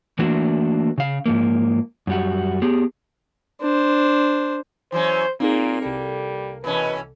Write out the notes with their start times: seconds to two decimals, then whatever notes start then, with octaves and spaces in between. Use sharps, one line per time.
0.19 E3 A3 A#3 D4 F#4 C5
0.98 C#3 F5
1.26 G#2 F3 A#3
2.07 F#2 G3 F#4
2.62 B3 G4 G#4
3.61 D4 C5
4.92 E3 F#3 C#4 C5
5.40 A#2 A#3 C4 D#4 G#4
5.82 C2 G3 A4
6.64 B2 E3 C#4 B4